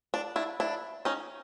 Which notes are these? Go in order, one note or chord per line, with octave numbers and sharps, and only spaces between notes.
D4
D4 E4
D4 E4
C#4 D#4